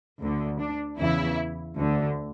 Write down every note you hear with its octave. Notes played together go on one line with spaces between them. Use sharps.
D2 D3
D4
E2 C#3 E3 E4
D2 D3